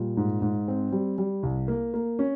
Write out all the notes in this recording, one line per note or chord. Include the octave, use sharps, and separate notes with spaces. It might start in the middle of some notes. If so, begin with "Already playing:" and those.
Already playing: A#2 G3
G#2
G#2
C4
G3
G3
C2
A#3
A#3
C#4